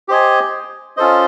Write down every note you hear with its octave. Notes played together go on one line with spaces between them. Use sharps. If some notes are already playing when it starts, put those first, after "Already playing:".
G4 C5 D#5 G#5
C#4 F4 A4 C5 D#5